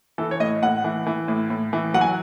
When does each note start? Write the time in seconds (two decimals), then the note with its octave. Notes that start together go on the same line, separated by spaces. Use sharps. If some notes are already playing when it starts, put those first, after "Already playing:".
0.18 E3 A4
0.31 C#5
0.40 A2 D#5
0.62 A2 F#5
0.84 E3
1.06 E3
1.28 A2
1.50 A2
1.73 E3
1.94 F#3 F#5
2.01 G#5